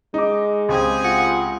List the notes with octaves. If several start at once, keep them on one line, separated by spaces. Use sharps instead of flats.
G#3 D#4 D6
C#2 C4 G4 G#4 G#5
F4 F#5